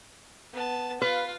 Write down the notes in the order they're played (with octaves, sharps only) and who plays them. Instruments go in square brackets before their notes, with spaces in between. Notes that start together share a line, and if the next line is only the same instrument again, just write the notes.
[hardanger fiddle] B3 A5
[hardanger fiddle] F4 F5 [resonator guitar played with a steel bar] B4